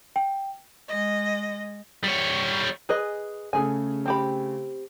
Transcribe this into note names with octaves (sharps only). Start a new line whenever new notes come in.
G5
G#3 D#5
G3 C#5
G#4 B4 D#5
C#3 A3 C#4 G#4 G#5
C4 G4 B5